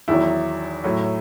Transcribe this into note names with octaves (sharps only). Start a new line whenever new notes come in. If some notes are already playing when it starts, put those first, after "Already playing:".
E2 D#3 F#3 E4
A2 F#3